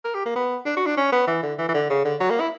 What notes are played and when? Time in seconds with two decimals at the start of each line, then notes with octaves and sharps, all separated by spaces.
0.05 A#4
0.15 G4
0.26 A#3
0.36 B3
0.66 D4
0.77 F#4
0.86 D4
0.97 C#4
1.12 B3
1.27 E3
1.43 D3
1.58 E3
1.69 E3
1.74 D3
1.90 C#3
2.05 D3
2.20 F#3
2.30 A#3
2.40 E4